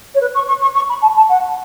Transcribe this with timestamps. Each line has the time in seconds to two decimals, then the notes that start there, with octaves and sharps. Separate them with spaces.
0.14 C#5
0.20 B4
0.34 C#6
0.48 C#6
0.61 C#6
0.75 C#6
0.89 B5
1.01 A5
1.16 A5
1.29 F#5